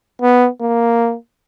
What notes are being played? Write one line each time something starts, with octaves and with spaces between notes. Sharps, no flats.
B3
A#3